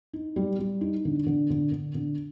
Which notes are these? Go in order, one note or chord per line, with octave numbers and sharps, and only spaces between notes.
D#4
G3
G3
D#4
D3
D3
D3
D3
D3